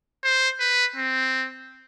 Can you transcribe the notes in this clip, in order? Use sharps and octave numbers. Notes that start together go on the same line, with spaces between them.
C5
B4
C4